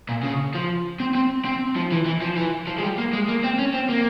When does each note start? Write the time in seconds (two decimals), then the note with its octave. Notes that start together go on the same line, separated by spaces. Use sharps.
0.09 A#2
0.23 C#3
0.55 F3
1.00 C4
1.15 C4
1.45 C4
1.76 F3
1.92 E3
2.06 E3
2.22 F3
2.37 E3
2.67 F3
2.78 G#3
2.83 G3
2.98 A#3
3.13 G#3
3.28 A#3
3.43 C4
3.59 C#4
3.74 C4
3.90 A#3